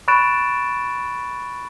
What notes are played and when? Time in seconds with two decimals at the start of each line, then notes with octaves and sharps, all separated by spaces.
0.08 B5 C#6 F#6 A6 D7 E7